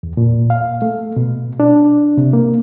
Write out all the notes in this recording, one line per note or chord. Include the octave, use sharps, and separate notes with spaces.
E2
A#2
F5
A3
B2
D4
C3
A#3